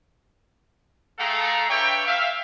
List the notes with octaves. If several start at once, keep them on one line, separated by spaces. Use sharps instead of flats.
A3 G#4 A4 F5 G5 A#5
D4 B4 C#5 E5 G5
E5 F5